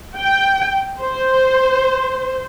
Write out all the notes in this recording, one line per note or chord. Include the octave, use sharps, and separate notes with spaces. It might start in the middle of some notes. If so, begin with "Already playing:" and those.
G5
C5